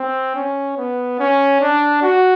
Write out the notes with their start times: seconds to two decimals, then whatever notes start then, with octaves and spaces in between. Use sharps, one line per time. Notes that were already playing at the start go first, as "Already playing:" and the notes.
Already playing: C4
0.36 C#4
0.77 B3
1.19 C#4
1.61 D4
2.02 F#4